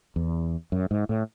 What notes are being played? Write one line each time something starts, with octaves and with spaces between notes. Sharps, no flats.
E2
F#2
G#2
A2